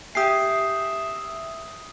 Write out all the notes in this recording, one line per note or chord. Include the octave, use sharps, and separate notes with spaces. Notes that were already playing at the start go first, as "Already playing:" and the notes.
G4 E5 G#5 D#6 C7